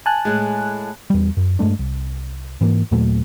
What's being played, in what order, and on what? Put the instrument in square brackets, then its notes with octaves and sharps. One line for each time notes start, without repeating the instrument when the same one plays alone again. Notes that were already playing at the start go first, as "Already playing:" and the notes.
[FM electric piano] G#5 A5 F#6
[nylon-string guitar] A2 G#3
[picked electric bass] E2 G3
F#2
G2 G#3 A3 D4
C2
G#2 E3 A#3
D#2 A#2 F#3 A3